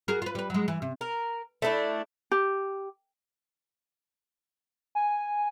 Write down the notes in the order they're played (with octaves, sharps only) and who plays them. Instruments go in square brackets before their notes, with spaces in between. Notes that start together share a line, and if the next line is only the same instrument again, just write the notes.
[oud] F#4 G#4 A#4
F4 B4
G3 B4
F#3 G#3
E3
C3
[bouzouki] A#4
A3 C#4 D4 E4
[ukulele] G4
[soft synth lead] G#5